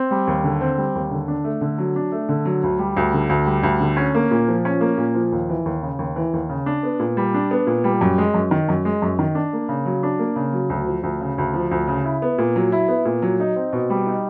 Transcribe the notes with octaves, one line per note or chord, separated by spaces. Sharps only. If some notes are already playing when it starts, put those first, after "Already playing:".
Already playing: C4
G3
D#2
D3
C4
G3
D#2
D3
D4
A3
D3
F#3
D4
A3
D3
F#3
D2
G3
D2
D3
D2
G3
D2
D3
C#4
A#3
A#2
F3
C#4
A#3
A#2
F3
D#2
E3
D#2
C#3
D#2
E3
D#2
C#3
D4
B3
A#2
G3
D4
B3
A#2
G3
F#2
G#3
F#2
D#3
F#2
G#3
F#2
D#3
D4
A#3
C#3
F#3
D4
A#3
C#3
F#3
D2
F3
D2
C#3
D2
F3
D2
C#3
E4
B3
A#2
F#3
E4
B3
A#2
F#3
D#4
C4
B2
G3
D#4